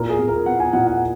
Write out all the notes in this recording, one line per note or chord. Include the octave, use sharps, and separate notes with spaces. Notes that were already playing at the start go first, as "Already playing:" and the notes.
Already playing: A#2 A#4
G#4
A#2
A#4
B3 F#5
G#5
A#2 F#5
F#5